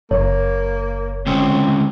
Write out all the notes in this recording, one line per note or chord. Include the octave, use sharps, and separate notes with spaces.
F#1 A#3 C#5
D3 G#3 C4 C#4